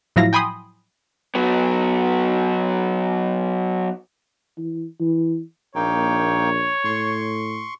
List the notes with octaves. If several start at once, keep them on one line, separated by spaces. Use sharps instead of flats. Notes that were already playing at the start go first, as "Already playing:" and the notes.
A2 F3 F#3 E4 F5 A#6
G5 G#5 B5 C6 D#6
F#3 B3
E3
E3
A#1 A#3 D#4 C#5 G5
A2 C6 C#6